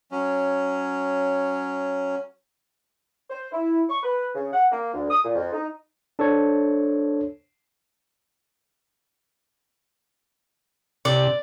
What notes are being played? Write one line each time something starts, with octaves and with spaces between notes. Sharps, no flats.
F#3 C#4
C5
E4
C#6
B4
C#3
F#5
A#3
D2
D#6
A#2
F2
D#4
D4 A4 C5 C#5
C3 D5